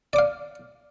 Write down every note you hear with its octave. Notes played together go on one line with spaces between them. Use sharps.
D5 F5 D6